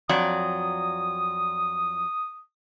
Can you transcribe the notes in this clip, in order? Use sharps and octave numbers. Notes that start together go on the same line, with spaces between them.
F2 F#3 D5 D#6